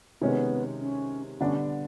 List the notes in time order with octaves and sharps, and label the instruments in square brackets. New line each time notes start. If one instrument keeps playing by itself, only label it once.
[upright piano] C3 D#3 G#3 C#4 [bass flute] B3
[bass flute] C#4
[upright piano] D3 G3 B3 D4 [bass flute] C#4